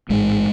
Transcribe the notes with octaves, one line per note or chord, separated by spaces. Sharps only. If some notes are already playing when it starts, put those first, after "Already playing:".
A1 G#2 G#3